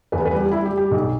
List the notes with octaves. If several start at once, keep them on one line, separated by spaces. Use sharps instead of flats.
E2 B4
B4
G3
G4
G3 E4
G4
G3
G4
B1